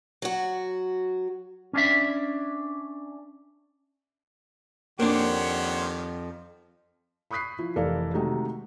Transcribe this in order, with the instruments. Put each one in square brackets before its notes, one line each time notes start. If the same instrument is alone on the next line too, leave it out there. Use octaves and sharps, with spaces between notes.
[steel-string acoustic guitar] F#3 F#4
[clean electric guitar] C#4 D4 E5
[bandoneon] F2 [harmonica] D#3 G4 [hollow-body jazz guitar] A#3 D4 [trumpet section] C5 C#5 F#5
[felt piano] B5 C#6 D#6 F#6 B6 C7
F3 E4
F1 E3 A4 A#4 D5 F5
C3 D#3 G#3 A3 D#4 F#4